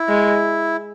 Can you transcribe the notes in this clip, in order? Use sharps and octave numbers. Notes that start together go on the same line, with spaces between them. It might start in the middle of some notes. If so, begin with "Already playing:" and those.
Already playing: E4
G#3